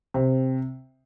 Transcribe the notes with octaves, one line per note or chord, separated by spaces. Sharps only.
C3